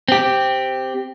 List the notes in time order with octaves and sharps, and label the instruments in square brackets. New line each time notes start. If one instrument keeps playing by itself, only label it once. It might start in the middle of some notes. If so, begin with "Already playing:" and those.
[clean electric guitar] C4 G4